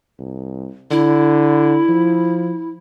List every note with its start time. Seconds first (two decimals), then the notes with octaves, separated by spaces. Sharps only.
0.19 C2
0.91 D3 E4
1.89 F3